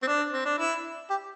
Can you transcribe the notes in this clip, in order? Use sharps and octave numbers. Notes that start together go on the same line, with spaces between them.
C4
D4
C4
D4
E4
G4